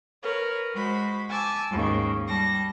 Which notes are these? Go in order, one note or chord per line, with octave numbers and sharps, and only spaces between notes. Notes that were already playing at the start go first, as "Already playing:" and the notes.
A#4 B4 C#5
G#3 F#4 C5 B5
G#5 A5 D6 E6
D#2 G#2 C#3
G3 A5 A#6